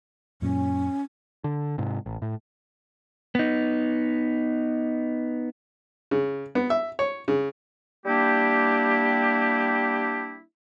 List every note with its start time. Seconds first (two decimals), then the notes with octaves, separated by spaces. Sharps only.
0.42 F#2 A#2 C#4
1.44 D3
1.78 G#2 C3
2.06 A1
2.22 A2
3.35 B3 D#4
6.11 C#3
6.55 B3
6.70 E5
6.99 C#5
7.28 C#3
8.05 G3 A#3 D4 E4 G4